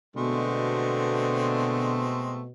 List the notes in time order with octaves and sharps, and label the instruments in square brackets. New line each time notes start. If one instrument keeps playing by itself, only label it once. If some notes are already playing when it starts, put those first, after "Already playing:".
[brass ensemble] B2 [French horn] D3 [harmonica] G#3 A3 C4